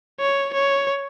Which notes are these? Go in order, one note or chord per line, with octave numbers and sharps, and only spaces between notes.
C#5
C#5